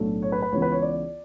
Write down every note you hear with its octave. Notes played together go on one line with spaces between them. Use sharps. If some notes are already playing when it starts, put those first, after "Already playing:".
Already playing: B1 A2 F#3 A3 D4
C#5
B4
B4
C#2 C#3 E3 B3 C#5
B4
C#5
D5